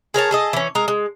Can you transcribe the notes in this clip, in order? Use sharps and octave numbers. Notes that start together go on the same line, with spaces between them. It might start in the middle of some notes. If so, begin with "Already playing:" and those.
G#4 A#4 C#5 A5
G#4 A4 D#5
E3 C#4
G#3 A#4
G#3